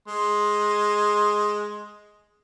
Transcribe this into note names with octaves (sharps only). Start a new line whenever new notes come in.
G#3 C6